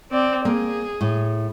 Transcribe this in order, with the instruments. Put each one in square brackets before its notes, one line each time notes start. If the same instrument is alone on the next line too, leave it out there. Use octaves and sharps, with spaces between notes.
[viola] C4 D5
[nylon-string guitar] A#3 [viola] G#4
[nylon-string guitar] A2